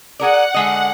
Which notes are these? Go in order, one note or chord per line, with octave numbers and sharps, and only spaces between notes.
G#4 A#4 D5 F#5
D3 G#3 D#5